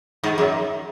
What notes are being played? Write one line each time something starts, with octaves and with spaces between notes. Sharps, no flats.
G#2
F#2